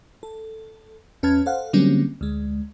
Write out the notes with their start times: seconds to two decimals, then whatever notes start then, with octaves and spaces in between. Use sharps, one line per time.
0.23 A4
1.23 E2 C#4 B4 A5 F6 G#6
1.46 A4 C5 F5 F#5
1.73 D3 F#3 G3 A#3 C4 C#4
2.21 D2 G#3